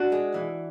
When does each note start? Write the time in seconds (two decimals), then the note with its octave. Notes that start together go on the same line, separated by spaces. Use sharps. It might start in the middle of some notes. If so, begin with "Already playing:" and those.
Already playing: D4 F#4
0.12 G#3
0.34 E3